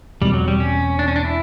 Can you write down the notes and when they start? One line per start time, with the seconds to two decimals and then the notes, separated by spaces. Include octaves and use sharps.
0.21 E2 B2 G3 G#3 C4
0.34 F#3
0.48 G3
0.60 C#4
0.99 D4
1.08 C#4
1.16 D4
1.25 E4